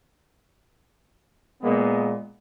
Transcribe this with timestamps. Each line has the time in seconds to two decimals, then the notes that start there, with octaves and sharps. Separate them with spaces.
1.62 A#2 G#3 A#3 B3